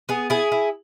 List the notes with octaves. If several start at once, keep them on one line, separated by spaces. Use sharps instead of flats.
B3 G#4
E4 G#4
E4